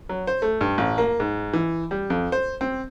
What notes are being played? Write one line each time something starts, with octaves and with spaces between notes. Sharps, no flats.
F#3
C5
A3
G2
A1
A#3
G#2
E3
G3
F2
C5
C4